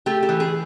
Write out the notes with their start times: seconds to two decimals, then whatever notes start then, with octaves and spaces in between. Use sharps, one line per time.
0.06 A3 G4
0.23 G4
0.29 E3
0.40 G#4